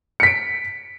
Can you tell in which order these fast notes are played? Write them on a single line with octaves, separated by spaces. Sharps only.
C#7 B6 D7